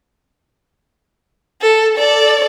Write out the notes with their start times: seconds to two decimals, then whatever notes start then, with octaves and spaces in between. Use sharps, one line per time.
1.62 A4
1.98 A4 D5